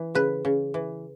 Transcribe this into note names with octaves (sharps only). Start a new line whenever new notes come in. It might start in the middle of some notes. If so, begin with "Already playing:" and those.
Already playing: E3
C#3 B4
C#3
E3